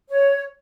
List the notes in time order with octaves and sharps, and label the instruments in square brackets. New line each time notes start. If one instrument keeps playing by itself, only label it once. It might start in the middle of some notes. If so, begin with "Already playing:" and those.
[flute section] C#5